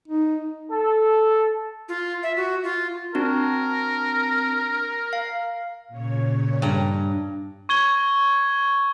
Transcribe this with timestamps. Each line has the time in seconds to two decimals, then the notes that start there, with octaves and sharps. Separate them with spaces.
0.08 D#4
0.71 A4
1.89 F4
2.23 E5
2.36 F#4
2.64 F4
3.15 C4 D4 F#4 A#4
5.13 F5
5.88 A#2 C#3 C#5
6.62 G2 A#5
7.69 C#6 G#6 G7